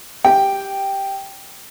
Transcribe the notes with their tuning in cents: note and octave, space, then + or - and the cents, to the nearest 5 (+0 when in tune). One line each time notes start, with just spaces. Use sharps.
G4 +5 G5 +0